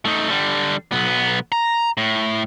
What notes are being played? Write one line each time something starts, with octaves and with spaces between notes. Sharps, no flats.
A3 D#4
D3 G3
B1 B3
A#5
A2